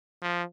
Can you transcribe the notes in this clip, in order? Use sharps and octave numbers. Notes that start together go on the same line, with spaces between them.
F3